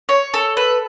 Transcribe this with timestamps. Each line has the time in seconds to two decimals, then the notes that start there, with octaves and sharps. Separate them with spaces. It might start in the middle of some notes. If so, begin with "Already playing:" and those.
0.09 C#5
0.34 A4
0.57 B4